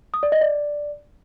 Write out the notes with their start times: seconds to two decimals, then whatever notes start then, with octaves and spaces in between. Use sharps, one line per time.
0.14 D#6
0.23 D5
0.32 D#5
0.41 D5